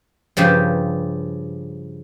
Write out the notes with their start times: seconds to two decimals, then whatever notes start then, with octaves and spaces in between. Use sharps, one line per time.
0.37 G2 C#3 F3 G4